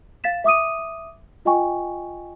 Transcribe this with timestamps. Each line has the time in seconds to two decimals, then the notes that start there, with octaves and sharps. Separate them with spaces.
0.24 F5 A6 B6 E7
0.44 E5 D6 D#6 D#7
1.45 F4 D#5 G5 G#5 C#6